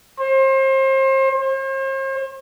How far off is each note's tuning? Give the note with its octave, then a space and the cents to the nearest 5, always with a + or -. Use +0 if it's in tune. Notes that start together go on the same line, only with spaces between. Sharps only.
C5 +35
C5 +45